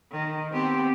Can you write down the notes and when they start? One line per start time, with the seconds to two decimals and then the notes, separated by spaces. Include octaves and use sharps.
0.11 D#3
0.53 B3 C4 G4